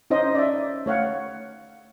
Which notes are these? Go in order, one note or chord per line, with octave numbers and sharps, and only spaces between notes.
C#4 D#4 C5 D#5
D5 E5
A3 C#5 F5 F#5